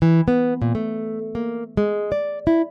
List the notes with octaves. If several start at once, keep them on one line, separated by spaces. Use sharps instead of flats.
E3
B3
A#2
A3
A#3
G#3
D5
E4